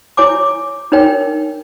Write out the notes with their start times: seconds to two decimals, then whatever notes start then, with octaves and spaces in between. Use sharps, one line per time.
0.17 E4 C#5 G#5 D6
0.92 D4 D#4 A#4 C#5 G5